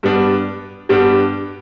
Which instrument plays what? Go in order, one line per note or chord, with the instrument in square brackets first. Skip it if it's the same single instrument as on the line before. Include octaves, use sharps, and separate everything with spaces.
[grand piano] G2 G3 B3 D4
G2 G3 B3 D4